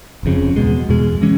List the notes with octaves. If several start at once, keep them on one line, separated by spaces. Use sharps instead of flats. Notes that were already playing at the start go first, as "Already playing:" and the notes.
F#1 F2 C#3
E2 B2 G#3
E2 B2 G#3
E3 G#3 C#4